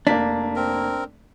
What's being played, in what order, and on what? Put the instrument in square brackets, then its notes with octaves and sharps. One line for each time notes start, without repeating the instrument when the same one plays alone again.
[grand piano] F1 A#3 B6 [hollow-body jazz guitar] D4
[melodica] C4 A#4